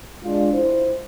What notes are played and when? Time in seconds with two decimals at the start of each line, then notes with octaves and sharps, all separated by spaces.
0.24 G#3 D4 F4
0.53 E4 C5